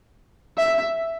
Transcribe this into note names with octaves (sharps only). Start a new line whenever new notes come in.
E5